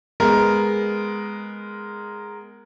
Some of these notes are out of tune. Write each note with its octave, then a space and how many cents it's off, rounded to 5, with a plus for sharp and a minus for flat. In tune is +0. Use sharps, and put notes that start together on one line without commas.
G#3 +0 B3 +0 A#4 +0